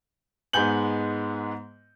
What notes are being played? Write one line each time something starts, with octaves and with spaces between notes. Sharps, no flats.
G#2 G#3 B3 G#5 G6 F#7